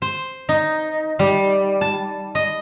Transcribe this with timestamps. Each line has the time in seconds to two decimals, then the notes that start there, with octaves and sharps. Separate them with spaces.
0.02 C5
0.49 D#4
1.19 G3
1.81 A5
2.35 D#5